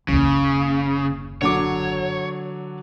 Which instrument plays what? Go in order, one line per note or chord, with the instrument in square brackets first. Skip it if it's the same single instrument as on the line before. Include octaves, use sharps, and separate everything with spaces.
[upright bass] F#1 D#2 [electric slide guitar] C#3
[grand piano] D3 F#3 D6 [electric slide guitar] C#5